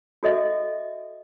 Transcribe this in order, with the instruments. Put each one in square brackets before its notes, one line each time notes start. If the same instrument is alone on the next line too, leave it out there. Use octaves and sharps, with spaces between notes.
[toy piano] F#4 A4 D#5 E5